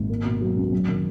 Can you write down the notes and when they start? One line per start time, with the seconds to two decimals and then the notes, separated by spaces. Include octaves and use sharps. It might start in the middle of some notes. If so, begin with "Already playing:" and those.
Already playing: G#1
0.09 A#3
0.25 B2
0.41 F#3
0.57 C#2
0.73 F#2
0.88 D#3